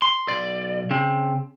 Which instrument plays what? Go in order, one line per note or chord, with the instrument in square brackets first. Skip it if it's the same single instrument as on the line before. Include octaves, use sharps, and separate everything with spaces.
[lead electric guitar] C6
B1 D5
C#3 C4